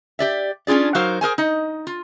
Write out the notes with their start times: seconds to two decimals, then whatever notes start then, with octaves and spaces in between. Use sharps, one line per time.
0.19 G4 D5 E5
0.67 C#4 D4 F4 G#4 D5
0.95 F#3 D#4 F#4 A#4 C5 F5
1.21 G#4 A#4 C5 G#5
1.38 D#4 D#5
1.87 F4